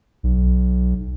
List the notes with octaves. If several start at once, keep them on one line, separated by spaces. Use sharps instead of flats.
B1